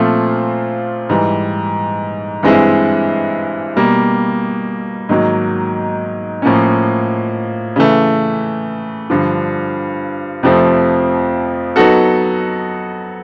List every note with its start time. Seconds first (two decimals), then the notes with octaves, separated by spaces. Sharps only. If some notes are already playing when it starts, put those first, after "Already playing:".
Already playing: A#2 F3 A3 C4 F4
1.09 G#2 E3 G3
2.43 G2 E3 G#3 C4 E4
3.76 B2 G3 A#3
5.09 G#2 D#3 F#3 A#3
6.42 A2 F3 A#3 C#4
7.76 C#3 E3 A3
9.10 G2 D3 F3
10.43 F2 C3 F3 A3 C4
11.76 F#3 B3 D#4 F#4 A4